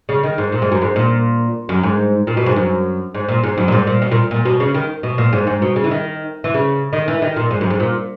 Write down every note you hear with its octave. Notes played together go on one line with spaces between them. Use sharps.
C#3
D#3
G#2
A#2
G#2
F#2
G#2
A#2
F#2
G#2
A#2
B2
G#2
F#2
G#2
A#2
G#2
F#2
A#2
G#2
A#2
B2
A#2
A#2
B2
C#3
D#3
B2
A#2
G#2
G#2
B2
C#3
E3
D#3
E3
C#3
D#3
E3
D#3
A#2
G#2
F#2
G#2
A#2